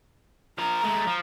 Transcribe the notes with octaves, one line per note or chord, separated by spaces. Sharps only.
F3 A#4 A#5
G#3 A3
F3